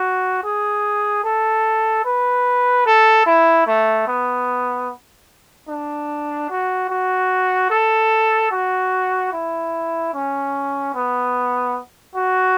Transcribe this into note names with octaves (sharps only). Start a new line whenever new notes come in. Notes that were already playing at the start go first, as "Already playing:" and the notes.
Already playing: F#4
G#4
A4
B4
A4
E4
A3
B3
D4
F#4
F#4
A4
F#4
E4
C#4
B3
F#4